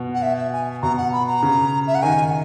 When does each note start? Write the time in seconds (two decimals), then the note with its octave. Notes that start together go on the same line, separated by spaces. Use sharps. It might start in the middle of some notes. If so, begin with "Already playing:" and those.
Already playing: B2
0.14 F#5
0.22 E5
0.37 E5
0.52 G#5
0.82 B2 A#5
0.97 F#5
1.13 B5
1.27 A#5
1.42 C#3
1.87 E5
1.95 F#5
2.02 D#3 G#5